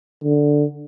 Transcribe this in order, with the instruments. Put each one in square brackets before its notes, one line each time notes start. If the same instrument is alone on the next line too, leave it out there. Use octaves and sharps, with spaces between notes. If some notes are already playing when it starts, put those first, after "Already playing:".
[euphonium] D3